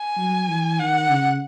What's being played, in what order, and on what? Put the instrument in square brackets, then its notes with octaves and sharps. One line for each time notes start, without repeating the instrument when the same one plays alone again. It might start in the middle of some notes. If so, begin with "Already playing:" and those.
Already playing: [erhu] G#5
[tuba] F#3
E3
[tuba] D#3 [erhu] F#5
[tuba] C#3